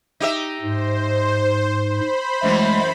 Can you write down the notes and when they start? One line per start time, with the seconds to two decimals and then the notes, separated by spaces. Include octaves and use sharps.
0.20 D#4 G4 E5
0.61 G#2 C5
1.84 C5 B5
2.43 F#2 E3 G#3 A3